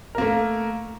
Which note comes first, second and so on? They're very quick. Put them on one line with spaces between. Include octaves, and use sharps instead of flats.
A#4 A#3 A3